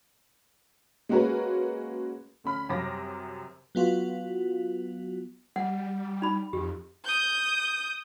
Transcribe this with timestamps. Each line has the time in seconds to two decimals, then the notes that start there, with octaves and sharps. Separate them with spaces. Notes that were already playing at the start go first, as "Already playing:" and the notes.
1.09 G#3 A#3 C#4 F#4 A#4 B4
2.44 D2 C#4 B5 F6
2.69 F#2 C3 G3 C#5 D6 A#6
3.75 F#3 B3 F4 F#4
5.56 G3 F#5
6.22 D#4 B5
6.53 F2 G4
7.04 D#6 G6